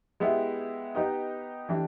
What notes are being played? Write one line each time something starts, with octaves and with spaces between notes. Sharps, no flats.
G#3 B3 E4 G4
B3 D#4 G4 B4 D#5
E3 A3 D4 G4